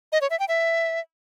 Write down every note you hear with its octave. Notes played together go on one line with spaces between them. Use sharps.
D#5
C#5
E5
G5
E5